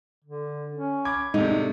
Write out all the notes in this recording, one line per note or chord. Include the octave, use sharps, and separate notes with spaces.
D3
C#4
B5 D6 G#6
A2 C3 G#3 D4 D#4